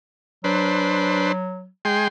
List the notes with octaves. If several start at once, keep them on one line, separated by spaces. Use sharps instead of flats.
F#3 D4 B4 C5
G#3 G5 C6